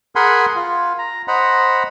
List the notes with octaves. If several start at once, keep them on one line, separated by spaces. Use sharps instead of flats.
G#4 A#4 F#5 G#5 B5 C6
F4
A#5
C5 D#5 F#5 A#5 B5